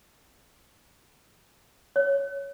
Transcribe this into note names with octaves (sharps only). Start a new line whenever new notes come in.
C#5